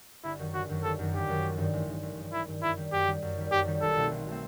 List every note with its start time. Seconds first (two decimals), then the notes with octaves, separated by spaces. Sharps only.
0.24 G1 E4
0.39 F#2 D#3 F#3
0.53 G1 F#4
0.69 F#2 D#3 F#3
0.83 G1 A4
0.99 F#2 D#3 F#3
1.13 G1 G4
1.28 F#2 D#3 F#3
1.43 A1
1.58 G2 D#3
1.73 A1
1.88 G2 D#3
2.03 A1
2.18 G2 D#3
2.33 A1 E4
2.48 G2 D#3
2.63 F#2 E4
2.77 D#3 G3
2.93 F#2 G4
3.07 D#3 G3
3.22 F#2
3.37 D#3 G3
3.52 F#2 G4
3.67 D#3 G3
3.82 B1 A4
3.97 B2 A3 C4
4.12 B1
4.27 B2 A3 C4